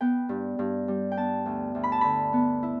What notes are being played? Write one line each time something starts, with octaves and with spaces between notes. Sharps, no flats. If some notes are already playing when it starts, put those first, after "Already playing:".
B3 G5
G2
G2
G3
G5
B3 A5
D2
D2
B5
A5
D3 B5
B3
E4